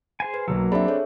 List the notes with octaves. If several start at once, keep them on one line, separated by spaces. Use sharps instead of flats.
G#4 C5 G#5
B4
B1 F#3 A#3 E6
C4 D4 G#4 E5 B5
A4 C#5